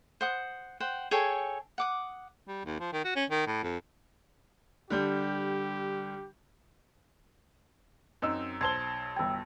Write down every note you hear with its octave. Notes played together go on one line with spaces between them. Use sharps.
C5 F#5 D#6
C5 F#5 G5
G#4 A4 C#5 G5
F#5 D6 D#6
G3
D#2
F3
D#3
F#4
C#4
D#3
A2
F2
D3 G3 G4 G6
F#2 C4 D#4 E6
B1 C5 A5 C6 G#6 G7
G1 G5 E6 G#6